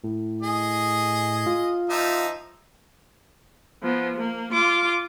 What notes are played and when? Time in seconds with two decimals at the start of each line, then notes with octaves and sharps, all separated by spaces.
0.04 A2
0.42 G#4 D#5
1.46 F4
1.90 F3 D#4 E5
3.83 F3 B3
4.17 A#3
4.53 F4 D6